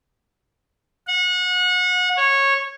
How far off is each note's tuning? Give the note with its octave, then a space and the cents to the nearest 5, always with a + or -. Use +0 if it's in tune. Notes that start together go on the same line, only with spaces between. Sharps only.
F#5 -30
C#5 -15